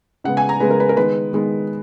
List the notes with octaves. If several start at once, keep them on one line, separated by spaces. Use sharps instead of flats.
C#3 G#3 B3 F#5
G#5
A#5
C#3 G#3 B3 B4
A#4
B4
A#4
D#3 G#3 B3 B4
D#3 G#3 B3